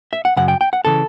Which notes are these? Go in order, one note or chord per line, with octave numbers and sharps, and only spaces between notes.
E5
F#5
F#2 C#3 F#5
G5
G5
F#5
C#3 E3 A4